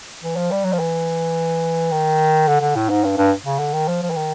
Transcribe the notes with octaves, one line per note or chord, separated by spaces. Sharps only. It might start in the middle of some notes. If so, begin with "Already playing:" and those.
E3
F3
G3
F#3
F3
E3
D#3
D3
D3
A2
G#2
G2
G2
C#3
D3
D#3
F3
F3
E3
D#3